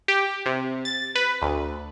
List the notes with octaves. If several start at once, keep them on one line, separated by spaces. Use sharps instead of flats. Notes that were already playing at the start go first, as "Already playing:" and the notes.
G4
C3
A6
B4
D2